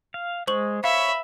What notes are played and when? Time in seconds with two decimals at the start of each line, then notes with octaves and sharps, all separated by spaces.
0.14 F5
0.47 G#3 C5 C#6 F#7
0.84 C#5 E5 F5 B5